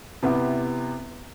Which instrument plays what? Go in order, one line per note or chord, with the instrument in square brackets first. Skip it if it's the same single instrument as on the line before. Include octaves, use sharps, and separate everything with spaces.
[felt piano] C3 B3 E4 G4